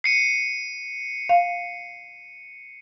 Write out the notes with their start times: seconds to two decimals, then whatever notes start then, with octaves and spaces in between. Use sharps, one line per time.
0.04 C7 C#7 D#7
1.29 F5